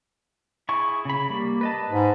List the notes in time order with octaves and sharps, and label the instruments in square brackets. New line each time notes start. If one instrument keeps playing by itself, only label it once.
[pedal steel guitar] E4 G#4 C#6
C#3 B5
G3 A#3
B4 D#5 A5
[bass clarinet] G#2